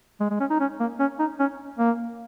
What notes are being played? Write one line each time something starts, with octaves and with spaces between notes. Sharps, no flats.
G#3
G#3
C#4
D#4
C#4
A#3
C#4
D#4
C#4
A#3